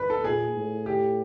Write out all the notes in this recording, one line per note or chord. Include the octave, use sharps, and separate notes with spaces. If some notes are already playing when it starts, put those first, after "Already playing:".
Already playing: B4
A4
A#2 G#4
A2
G4